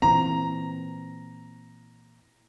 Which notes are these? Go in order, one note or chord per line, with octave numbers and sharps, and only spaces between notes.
A#2 E3 C4 A#5